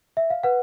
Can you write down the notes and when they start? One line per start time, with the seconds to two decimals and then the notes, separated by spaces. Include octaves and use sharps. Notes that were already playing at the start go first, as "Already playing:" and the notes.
0.17 E5
0.30 F5
0.43 B4 F#5